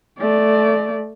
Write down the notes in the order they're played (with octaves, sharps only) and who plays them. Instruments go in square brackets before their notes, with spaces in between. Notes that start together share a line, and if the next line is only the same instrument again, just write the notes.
[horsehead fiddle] A3 D5